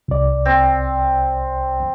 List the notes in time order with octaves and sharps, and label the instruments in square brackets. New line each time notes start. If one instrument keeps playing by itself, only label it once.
[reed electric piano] C2 D5
[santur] C4